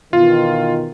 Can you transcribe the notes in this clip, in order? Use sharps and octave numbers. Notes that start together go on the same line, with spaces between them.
B2 D#3 E3 F4